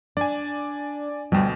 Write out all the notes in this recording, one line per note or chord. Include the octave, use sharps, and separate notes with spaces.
D4 D5 G#5
D2 B2 G3 G4